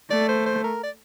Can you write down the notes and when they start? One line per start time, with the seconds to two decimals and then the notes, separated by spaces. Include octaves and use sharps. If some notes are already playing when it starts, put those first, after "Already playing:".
0.11 A3 D5
0.29 C5
0.46 C5
0.64 A#4
0.83 D5